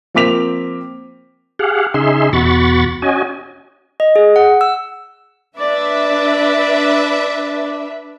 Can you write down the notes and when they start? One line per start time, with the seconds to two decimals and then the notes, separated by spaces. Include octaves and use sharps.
0.14 F3 A#3 C4 D6 B6 F7
1.59 G4 G#4 F5 F#5
1.94 C#3 D#4 G#4 E5 C6
2.33 E2 B2 F#4 B5 C#6 A6
3.02 C#4 F#4 D#5 G#5
4.00 D#5
4.16 G#4
4.36 F#5
4.61 E6
5.59 D4 B4 D5 E5